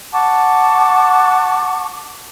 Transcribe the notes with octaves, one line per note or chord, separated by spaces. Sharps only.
F#5 A5 C#6 D6